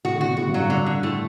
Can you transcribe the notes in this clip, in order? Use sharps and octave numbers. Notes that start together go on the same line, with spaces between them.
A2 F#4
D3
F#4
B2
A2 F#4
G2
F#3
G2
D3
D3
A2 A3